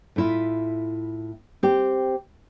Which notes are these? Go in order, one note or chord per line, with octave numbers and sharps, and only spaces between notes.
A2 E4 F4
C4 G4